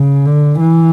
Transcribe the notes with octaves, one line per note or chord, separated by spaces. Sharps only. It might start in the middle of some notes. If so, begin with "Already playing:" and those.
Already playing: C#3
D3
E3